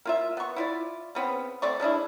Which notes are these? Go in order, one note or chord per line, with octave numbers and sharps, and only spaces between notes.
A#3 F4 E5
B3 C#6
E4 F4 D5
C#3 B3 C4
A3 C4 D5 C#6
G#3 C#4 D4 E4